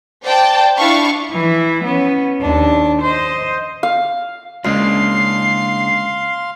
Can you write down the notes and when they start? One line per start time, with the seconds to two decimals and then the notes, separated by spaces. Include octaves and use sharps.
0.23 C5 D5 G5 A5
0.78 D4 E4 F4 F5 C#6
1.32 E3 E4
1.84 B3 C#4
2.41 D#2 D4
3.02 C5 D#5
3.83 F5
4.65 C#2 C#3 A#3 D4 F5 C6 C7